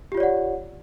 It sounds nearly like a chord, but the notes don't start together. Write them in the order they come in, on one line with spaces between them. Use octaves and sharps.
G4 F4 C#5 D5 F#5